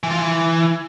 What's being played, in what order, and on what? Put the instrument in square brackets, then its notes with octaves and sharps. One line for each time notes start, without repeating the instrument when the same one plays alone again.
[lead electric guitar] E3
F4
E3